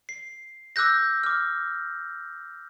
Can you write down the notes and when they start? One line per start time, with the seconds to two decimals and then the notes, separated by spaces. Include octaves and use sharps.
0.09 C7
0.76 D6 E6 F#6 G6 A#6
1.24 D6 F6